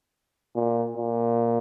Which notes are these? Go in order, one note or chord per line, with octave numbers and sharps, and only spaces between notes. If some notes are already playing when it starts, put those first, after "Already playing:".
A#2
A#2